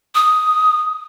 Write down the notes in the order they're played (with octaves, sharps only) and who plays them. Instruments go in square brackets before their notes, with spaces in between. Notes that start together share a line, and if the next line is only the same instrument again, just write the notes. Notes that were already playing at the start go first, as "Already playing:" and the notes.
[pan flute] D#6